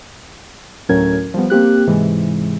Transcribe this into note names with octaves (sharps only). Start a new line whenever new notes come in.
D2 A2 F#3 C#4 A#4 G#6
F3 G3 B3
A#3 C4 G4 F#6
G#2 C3 E3 G#3